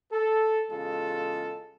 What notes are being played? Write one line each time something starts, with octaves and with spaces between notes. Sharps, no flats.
A4
E2 C#3 G#3 F4 A4